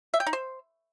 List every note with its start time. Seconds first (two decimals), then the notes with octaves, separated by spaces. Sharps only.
0.14 E5
0.20 G5
0.27 D#4
0.33 C5